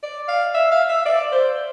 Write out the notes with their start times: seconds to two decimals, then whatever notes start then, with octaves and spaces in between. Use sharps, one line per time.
0.03 D5
0.28 F5
0.54 E5
0.72 F5
0.89 E5
1.06 D5
1.32 C5